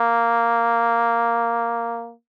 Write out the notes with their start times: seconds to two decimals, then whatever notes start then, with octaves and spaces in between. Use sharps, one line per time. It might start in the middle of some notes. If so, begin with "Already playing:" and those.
Already playing: A#3